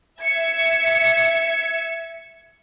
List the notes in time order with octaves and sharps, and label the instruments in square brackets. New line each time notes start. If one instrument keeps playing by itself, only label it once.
[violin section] E5 G#6 C#7